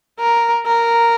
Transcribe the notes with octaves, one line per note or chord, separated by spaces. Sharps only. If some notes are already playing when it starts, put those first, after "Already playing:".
A#4
A#4